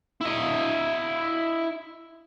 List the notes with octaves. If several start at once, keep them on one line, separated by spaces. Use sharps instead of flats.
E4 D#5